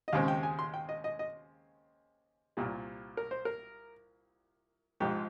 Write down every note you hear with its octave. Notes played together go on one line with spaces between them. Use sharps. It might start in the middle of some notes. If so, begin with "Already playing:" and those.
D#5
D#2 C#3 G#3 C4 F5
G5
G#5
C6
G5
D#5
D#5
D#5
C2 A#2 G3
A#4
C5
A#4
A#1 G#2 F3 G4